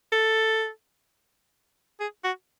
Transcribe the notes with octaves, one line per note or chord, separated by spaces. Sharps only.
A4
G#4
F#4